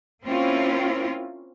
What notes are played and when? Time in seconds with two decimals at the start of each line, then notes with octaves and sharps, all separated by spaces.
0.25 A#3 C4 C#4 E4 F4